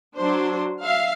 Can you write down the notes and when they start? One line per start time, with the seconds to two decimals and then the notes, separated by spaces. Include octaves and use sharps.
0.16 F#3 D4 C5
0.84 E5 F5